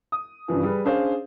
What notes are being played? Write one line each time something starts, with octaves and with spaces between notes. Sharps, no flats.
D#6
G2 C#3 E3 F3
G3 G#4 B4
C#4 D4 G#4 C5 F5